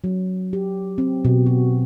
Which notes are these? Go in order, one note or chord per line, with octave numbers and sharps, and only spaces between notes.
F#3
G4
C4
B2
F#4